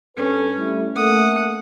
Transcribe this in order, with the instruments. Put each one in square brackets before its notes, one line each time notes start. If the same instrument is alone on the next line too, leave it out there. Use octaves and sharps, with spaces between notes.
[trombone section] G2 A4 B4 [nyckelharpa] C#4
[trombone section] G3 A3 E4
[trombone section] A3 A#3 [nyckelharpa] F#5 D#6